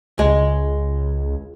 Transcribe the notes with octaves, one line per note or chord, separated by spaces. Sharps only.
C#2 G#3